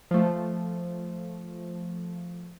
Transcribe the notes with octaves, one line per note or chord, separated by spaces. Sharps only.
F3 A3